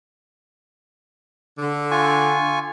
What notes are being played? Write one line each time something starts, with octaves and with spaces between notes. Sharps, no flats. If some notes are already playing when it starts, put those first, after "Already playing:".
D3
F4 G#5 C#6